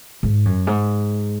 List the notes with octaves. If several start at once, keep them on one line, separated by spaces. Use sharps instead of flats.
G#2
F#2
G#2